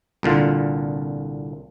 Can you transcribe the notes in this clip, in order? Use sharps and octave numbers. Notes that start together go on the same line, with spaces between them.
C2 A#2 D3 F4